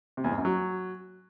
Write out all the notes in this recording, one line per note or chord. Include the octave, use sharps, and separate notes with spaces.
C3
E2
G#2
F#2
F#3